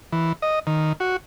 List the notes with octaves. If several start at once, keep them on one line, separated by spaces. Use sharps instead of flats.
E3
D#5
D#3
F#4